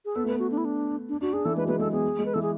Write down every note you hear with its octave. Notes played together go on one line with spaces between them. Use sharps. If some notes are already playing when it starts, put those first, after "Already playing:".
G#4
B3 A4
A3
B4
B3
F#4
D4
E4
D4
D4
D4 F#4
D4 G#4
E3 A4
G#3 B4
F#3
G#3 B4
G#3 A4
B3 G#4
G#3
B4
E3 A4
G#4